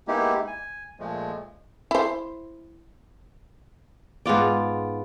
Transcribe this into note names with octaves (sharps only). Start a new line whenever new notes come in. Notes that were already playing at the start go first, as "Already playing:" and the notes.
G#3 A#3 B3 D#4 E4 G4
G#5
A#2 F3 G#3 A3
E4 C5
G#2 B3 F4 D5